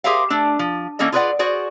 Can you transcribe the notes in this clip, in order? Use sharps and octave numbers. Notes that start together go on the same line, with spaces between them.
G4 G#4 A#4 C5 E5 F5
A3 D4
F3
E3 A#3 C#4 A4 D#5
F4 G#4 B4 C5 D5 F#5
F#4 G#4 C5 D5